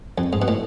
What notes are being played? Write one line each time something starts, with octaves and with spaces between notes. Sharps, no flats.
F2
G#2
B2
A2